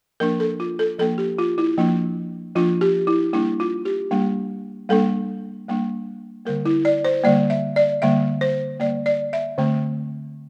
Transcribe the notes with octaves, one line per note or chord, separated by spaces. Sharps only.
F3 A#3 D4 A#4
A4
F4
A4
F3 A#3 D4 A4
G4
F4
E4
F3 A#3 D4
F3 A#3 D4 F4
G4
E4
G3 A#3 D4 E4
F4
G4
G3 A#3 D4
G3 A#3 D4 A4
G3 A#3 D4
D3 G3 A#3 A#4
E4
D5
C5
D3 G3 A#3 D5
E5
D5
D3 G3 A#3 E5
C5
D3 G3 A#3 D5
D5
E5
D3 A3 C4